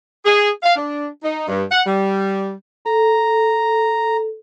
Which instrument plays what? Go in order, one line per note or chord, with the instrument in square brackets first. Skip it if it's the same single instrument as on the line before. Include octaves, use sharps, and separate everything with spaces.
[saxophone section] G#4
F5
D4
D#4
G2
F#5
G3
[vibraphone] A4 [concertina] A#5